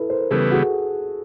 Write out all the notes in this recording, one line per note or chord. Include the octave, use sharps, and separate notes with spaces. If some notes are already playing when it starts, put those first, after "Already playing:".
Already playing: E4 A4 B4
A#4 C5
A#4
C#3 E3 G3 B3 A4 B4
F#4 G#4